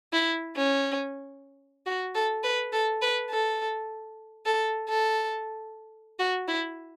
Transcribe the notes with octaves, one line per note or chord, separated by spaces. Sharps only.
E4
C#4
F#4
A4
B4
A4
B4
A4
A4
A4
F#4
E4